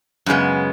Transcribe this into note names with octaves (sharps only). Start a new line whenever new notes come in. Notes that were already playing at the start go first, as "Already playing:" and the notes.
F#2 C#3 G#3 B3